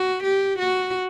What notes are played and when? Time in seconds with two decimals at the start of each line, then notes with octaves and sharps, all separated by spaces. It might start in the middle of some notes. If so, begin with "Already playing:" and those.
Already playing: F#4
0.23 G4
0.58 F#4